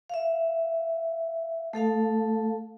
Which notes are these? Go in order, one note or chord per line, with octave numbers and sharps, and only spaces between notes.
E5 F5
A3 A4 F5 A5